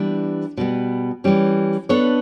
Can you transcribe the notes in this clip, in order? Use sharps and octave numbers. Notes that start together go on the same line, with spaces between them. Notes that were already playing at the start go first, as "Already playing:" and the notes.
Already playing: E3 G3 B3 D4
B2 G3 B3
E3 G3 C#4
B3 D4 A4 C#5